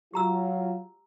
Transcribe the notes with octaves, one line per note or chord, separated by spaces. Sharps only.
F#3 F4 G4 A#5 E6